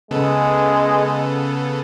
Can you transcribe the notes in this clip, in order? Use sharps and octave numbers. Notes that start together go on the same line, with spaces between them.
C#3 G#3 B3 A4